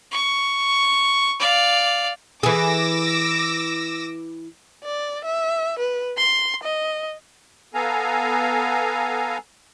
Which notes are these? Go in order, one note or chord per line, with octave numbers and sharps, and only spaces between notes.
C#6
D5 F5
E3 G#4 D6 E6 A#6
D5
E5
B4
C6
D#5
B3 A4 F5 G#5 A#5